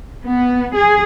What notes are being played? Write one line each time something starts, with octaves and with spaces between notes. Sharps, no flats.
B3
G#4